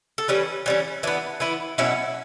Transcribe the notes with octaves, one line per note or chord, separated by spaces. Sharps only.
A4
E3 G3 C#4 B4
E3 G3 C#4
E3 B3 D4
E3 B3 E4
B2 F#3 C#4 E4